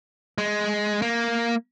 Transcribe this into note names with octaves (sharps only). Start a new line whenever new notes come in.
G#3
A#3